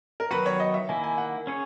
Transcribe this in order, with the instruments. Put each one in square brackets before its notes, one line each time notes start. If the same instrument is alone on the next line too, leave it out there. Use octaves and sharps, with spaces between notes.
[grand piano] A#4
[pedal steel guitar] D#3 F#3 B3 F#4 [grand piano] B4
[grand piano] C#5
D#5
E5
[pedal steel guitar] D#3 A#3 E4 [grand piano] G#5
[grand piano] G#5
F#5
[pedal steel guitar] C#4 G#4 C#5